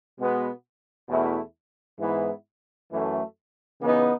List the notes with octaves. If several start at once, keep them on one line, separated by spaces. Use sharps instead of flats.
B2 G#3 B3 F#4
E2 B2 A3 E4
G#2 E3 B3 E4
F#2 E3 A3
C#3 E3 B3 D#4